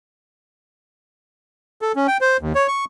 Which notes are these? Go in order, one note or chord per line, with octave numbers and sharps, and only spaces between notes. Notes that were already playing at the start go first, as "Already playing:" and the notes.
A4
C#4
G5
C5
D#2
C#5
C#6